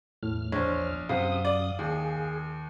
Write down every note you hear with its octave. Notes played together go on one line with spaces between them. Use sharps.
E2 A2 F6
A#1 C5 C#5
F#2 C3 F5 F#5 D#6
D5
D#2 G#4